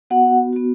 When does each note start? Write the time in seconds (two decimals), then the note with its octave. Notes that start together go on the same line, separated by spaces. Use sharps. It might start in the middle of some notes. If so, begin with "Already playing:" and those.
0.10 B3 F#4 F#5
0.53 B3 F#4